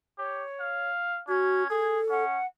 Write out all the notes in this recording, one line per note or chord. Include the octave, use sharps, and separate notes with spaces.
G4 C#5
F5
C#4 F#4 G#6
G#4 A4
C#4 F#5